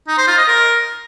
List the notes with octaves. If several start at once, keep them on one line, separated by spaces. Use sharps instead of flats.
D#4
C5
F4
D#5
A#4